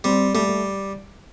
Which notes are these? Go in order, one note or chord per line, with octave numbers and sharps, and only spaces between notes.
G3 C4
G3 A3
A3